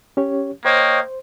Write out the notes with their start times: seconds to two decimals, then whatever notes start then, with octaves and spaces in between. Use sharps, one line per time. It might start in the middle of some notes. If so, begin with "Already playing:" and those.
0.17 C#4 G4 C#5
0.65 A#3 C5 C#5 D#5 G5